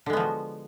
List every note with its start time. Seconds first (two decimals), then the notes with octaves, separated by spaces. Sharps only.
0.06 D3
0.10 G#3
0.13 B3
0.17 F3
0.20 F#4